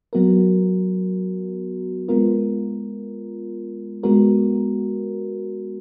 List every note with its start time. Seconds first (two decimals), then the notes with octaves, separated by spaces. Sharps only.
0.13 F#3 B3 F#4 A#4
2.08 G#3 B3 F4 A#4
4.03 G#3 B3 F#4 A#4